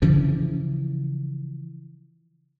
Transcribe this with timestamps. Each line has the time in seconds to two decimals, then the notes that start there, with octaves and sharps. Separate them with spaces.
0.02 C#3 E3 F3